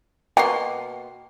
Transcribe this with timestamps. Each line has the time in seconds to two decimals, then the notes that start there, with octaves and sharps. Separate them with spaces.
0.37 B2 A#3 G5 C6